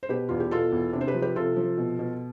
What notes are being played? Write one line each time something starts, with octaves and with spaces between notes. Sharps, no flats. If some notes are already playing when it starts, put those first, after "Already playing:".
C5
B2 G4 B4
E2 F4
G4
B2 F4 A4
E2
C3 D4
C5
G4 B4
F3
G4 B4
C3 F4 A4
F3
B2
B2